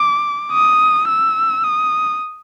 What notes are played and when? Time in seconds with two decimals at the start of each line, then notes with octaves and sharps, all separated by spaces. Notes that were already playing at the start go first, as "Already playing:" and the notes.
Already playing: D6
0.52 D#6
1.08 E6
1.64 D#6